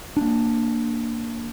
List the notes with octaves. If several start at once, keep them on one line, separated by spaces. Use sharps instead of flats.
A#3 D4